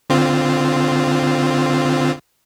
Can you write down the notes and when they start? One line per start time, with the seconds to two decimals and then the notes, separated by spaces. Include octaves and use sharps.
0.10 D3 C4 F4